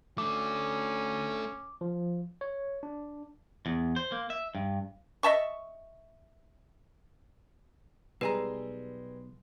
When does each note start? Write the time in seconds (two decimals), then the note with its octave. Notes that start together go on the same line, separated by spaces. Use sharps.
0.18 A3 C#4 D4 D6
1.81 F3
2.41 C#5
2.83 D4
3.66 E2
3.96 C5
4.12 A#3
4.30 E5
4.55 G2
5.23 D#5 E5 A5 C#6
8.21 B1 G3 G#3 B4 G#5 A#5